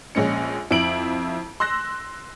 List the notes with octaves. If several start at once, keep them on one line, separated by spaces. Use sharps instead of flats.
A#1 G#3 C#4 C#7
F2 E4 D7 F#7
C6 E6 F#6 A#6